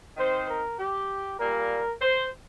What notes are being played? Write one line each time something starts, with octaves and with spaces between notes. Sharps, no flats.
D#3 C4 D#4 C5
A#4
G4
A#2 G3 A#3 A#4
C5